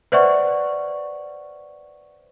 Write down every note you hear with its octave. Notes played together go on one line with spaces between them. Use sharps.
B4 C5 D5 E5 F#5 C#6